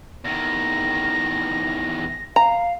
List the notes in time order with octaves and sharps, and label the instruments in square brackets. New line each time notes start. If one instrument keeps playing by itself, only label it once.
[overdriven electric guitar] E2 D#3 [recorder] A#6
[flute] F5 [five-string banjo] A#5